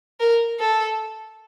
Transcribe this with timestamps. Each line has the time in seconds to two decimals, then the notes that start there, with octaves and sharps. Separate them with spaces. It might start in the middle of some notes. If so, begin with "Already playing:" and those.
0.20 A#4
0.60 A4